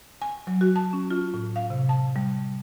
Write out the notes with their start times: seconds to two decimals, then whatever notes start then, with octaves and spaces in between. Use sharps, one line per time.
0.22 G#5
0.47 F#3
0.61 F#4
0.76 A5
0.93 C#4
1.10 F4
1.34 A2
1.56 F5
1.70 C3
1.89 A5
2.16 G3